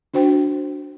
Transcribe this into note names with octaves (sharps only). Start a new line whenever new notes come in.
D4 F#4 C5 G5